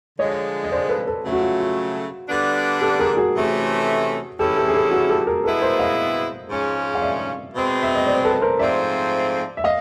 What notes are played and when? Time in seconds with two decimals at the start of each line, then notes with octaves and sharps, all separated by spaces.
0.19 D3 F3 G#3 C#5 D#5
0.64 D#5
0.72 C5 D5
0.89 A4 B4
1.07 A4 B4
1.24 C#3 F#3 A3
1.32 F#4
1.42 F4
1.60 F4
2.29 D3 G3 B3 D4
2.82 G4 A4
2.99 G#4 A#4
3.17 F#4 G#4
3.34 C3 E3 A3 C#4
4.39 A2 E3 G#3 C#4 E4 G4 A4
4.57 G4 A4
4.68 G#4
4.74 G4 A4
4.91 F#4 G#4
5.09 G4 A4
5.27 G#4 A#4
5.44 B2 G#3 B3 E4 G#4 A4 B4
5.62 A#4 C5
5.79 D#5 F5
6.49 G#2 F3 G#3 C#4
6.95 F5
7.02 D5 E5
7.54 B2 G#3 C4
7.82 E5
7.95 D#5
8.07 C5 D5
8.24 A4 B4
8.41 A#4 C5
8.59 G#2 F3 A3 C4 D5 E5
9.57 E5
9.64 D#5 F5